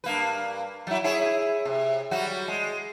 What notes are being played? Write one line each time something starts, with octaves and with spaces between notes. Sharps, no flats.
G2 A#3 B4
F#3 E4
E4 G#4 C#5
C3
F#3 G3 F#4
G#3